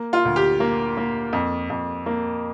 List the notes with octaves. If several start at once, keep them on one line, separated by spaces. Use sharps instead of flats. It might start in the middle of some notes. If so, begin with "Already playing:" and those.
Already playing: A#3
F4
D2
G4
A#3
A#3
F2
F2
A#3